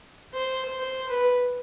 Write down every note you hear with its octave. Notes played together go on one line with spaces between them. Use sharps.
C5
C5
B4